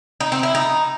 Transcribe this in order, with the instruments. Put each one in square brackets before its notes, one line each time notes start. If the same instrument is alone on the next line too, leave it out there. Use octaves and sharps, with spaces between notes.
[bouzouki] D#4
C4
E4
D#4